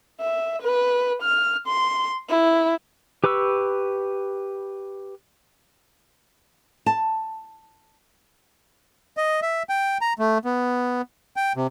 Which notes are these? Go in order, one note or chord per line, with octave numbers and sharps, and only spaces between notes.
E5
B4
F6
C6
E4
G4 B4 B5 C#6 E6
A5
D#5
E5
G5
A#5
A3
B3
G5
C3